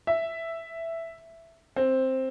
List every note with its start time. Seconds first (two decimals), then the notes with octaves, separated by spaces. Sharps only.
0.07 E5
1.76 C4